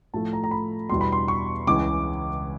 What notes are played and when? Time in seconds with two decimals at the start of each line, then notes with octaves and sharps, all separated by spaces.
0.14 A2 F3 A3 A5
0.33 A#5
0.44 A#5
0.51 B5
0.89 E2 B2 G3 C6
1.01 B5
1.12 C6
1.28 C#6
1.67 C#2 C#3 E3 G#3 D6